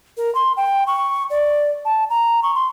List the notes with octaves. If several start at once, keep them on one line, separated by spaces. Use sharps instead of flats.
A#4
C6
G5
C#6
D5
A5
A#5
C#6
C6